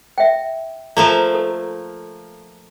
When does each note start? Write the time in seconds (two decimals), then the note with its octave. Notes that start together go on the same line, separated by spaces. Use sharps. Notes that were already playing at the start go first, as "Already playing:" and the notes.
0.18 E5 G5
0.97 F3 A3 A#3 A#5
1.35 A4